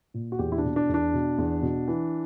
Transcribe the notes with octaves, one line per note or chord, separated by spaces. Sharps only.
A#2
F#4
E2 G4
E4
D4
B2
D4
E2 D4
B2
E2
B2
E3